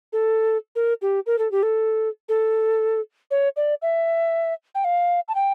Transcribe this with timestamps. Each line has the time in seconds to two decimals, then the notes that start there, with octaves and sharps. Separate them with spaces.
0.13 A4
0.75 A#4
1.02 G4
1.26 A#4
1.38 A4
1.51 G4
1.63 A4
2.29 A4
3.31 C#5
3.56 D5
3.82 E5
4.75 G5
4.84 F5
5.28 A5
5.35 G5